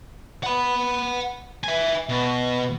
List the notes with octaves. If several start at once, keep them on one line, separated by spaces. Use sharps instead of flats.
F#5 B5
E5 G#5
B2